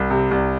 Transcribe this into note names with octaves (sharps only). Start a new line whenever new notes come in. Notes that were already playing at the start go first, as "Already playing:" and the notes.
Already playing: C2
C3
C2